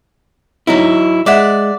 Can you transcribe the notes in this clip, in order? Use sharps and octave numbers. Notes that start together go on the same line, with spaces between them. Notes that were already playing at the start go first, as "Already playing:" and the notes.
F#3 D#4 E4
G#3 D5 E5 F#5